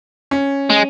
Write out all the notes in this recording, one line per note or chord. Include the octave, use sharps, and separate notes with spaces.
C#4
G#3